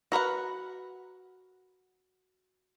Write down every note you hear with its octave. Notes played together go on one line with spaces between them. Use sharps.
F#4 A#4 B4 F#5